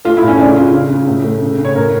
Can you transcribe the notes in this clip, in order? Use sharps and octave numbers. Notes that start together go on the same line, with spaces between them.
A3 F4
E4
A2
C#4
C#3 D4
C#3 F4
C#3
C#3
A2
A3
C#3
C#3
C#5
A2 A#4